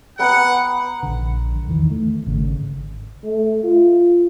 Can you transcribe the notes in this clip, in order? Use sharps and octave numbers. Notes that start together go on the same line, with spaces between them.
B3 F#5 G5 A#5
A#1 D3
E2 D#3 E3
A3
G#1 C#3
A3
F4